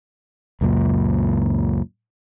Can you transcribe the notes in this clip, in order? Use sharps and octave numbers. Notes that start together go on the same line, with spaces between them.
C#2 F#2 A#2